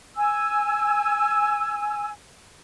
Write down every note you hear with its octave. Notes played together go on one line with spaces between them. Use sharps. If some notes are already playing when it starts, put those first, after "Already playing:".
G#5 E6